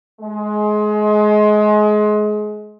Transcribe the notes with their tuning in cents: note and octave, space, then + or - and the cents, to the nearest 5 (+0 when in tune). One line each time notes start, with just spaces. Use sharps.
G#3 +25